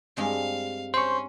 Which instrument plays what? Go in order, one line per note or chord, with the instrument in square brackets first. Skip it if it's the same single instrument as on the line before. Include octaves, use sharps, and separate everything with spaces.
[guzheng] G2 G#3 C4 [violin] F5
[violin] C#4 [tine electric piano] C5 [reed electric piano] C6 C#6